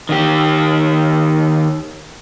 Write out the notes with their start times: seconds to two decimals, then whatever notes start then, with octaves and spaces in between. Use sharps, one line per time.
0.09 D#3 G4